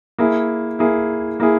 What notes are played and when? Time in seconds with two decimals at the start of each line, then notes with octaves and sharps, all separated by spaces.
0.18 A#3 E4 G#4
0.79 A#3 E4 G#4
1.40 A#3 E4 G#4